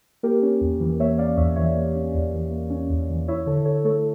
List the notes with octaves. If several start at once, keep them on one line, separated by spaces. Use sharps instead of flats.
A#3 G4 A#4
C#4
E2
E3
A#3 C#5 E5
C#4 D5 F5
E2 C#5 E5
E3 C#5 E5
A#3
C#4
E2
E3
A#3
C#4
E2
E3
E4 C#5 E5
D3 A4 C#5
D3 A4 C#5
A3 A4 C#5